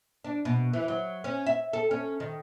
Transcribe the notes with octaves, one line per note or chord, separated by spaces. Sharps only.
D4
B2
E3
F#3
C#4
E5
A4
C#4
D#3